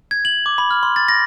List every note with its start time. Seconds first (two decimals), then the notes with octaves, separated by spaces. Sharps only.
0.11 G#6
0.25 F#7
0.46 D6
0.58 B5
0.71 F6
0.83 C6
0.96 A6
1.08 A#6